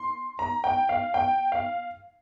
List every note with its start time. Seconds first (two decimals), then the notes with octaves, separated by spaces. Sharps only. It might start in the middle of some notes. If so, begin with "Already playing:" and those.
Already playing: C6
0.39 A#5
0.64 G5
0.89 F5
1.14 G5
1.52 F5